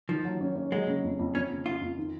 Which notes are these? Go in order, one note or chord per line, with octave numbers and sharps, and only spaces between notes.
D#3 F3
F#3
C#4
C#4
F#3 G#3
C#3
F2
F2
F2 C#4
C#3
C#3 F4
F2
D#3